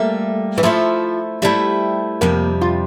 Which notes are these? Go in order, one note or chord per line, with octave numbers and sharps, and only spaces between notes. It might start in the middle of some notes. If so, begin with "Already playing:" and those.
Already playing: G3 A3 A#3 F4 A4 E5
E3
F3 A3 E4 A4 C5 E5
G3 A3 E4 A4 C5 E5
F2 C3 G3 A#3
F4